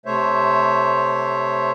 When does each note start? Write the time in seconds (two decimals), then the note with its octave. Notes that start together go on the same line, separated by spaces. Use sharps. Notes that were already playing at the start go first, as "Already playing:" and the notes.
0.06 C3 A3 C5 C#5 E5